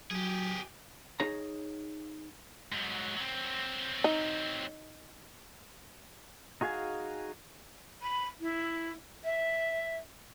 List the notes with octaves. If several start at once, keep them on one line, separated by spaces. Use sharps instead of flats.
F#3 G4 G#4
D#4 G#4 C#5 A#5
G#2 F#3
F#3 C4
D#4
D#4 F#4 G#4 F5 G#5
B5
E4
E5